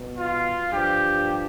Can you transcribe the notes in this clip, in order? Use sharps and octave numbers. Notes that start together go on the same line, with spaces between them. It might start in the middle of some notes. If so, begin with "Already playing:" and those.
Already playing: B2
F4
G2 F3 G4